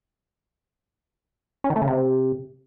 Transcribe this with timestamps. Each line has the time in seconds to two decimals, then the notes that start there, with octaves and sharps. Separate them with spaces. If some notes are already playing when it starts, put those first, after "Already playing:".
1.64 C#4
1.70 D#3
1.76 A3
1.82 C#3
1.87 C3